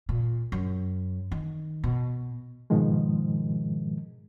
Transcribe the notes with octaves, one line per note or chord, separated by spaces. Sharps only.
A#2
F#2
D#3
B2
G#2 B2 D#3 F3 G#3